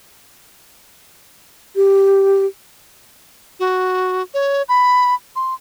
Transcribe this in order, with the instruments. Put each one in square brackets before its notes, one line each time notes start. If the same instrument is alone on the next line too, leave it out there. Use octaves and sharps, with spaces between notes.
[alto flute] G4
[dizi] F#4
C#5
B5
C6